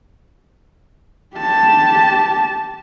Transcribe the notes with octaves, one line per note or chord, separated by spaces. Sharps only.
G4 A5